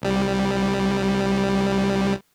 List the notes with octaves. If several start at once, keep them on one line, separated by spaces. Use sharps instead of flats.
C2 G3